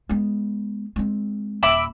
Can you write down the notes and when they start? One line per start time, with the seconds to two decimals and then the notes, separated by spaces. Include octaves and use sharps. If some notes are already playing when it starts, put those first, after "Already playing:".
0.09 G#3 B3
0.96 G#3 C4
1.63 D#1 E5 B5 D6